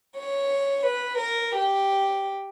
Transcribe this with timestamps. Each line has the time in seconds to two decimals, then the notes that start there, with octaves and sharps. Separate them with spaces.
0.17 C#5
0.87 B4
1.20 A#4
1.55 G4